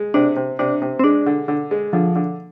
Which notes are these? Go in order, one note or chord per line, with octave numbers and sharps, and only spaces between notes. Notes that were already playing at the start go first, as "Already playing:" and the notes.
Already playing: G#3
C3 D4
C3
C3 D4
C3
C4
G#3 D4
D3
D3
G#3
D3 F3
D3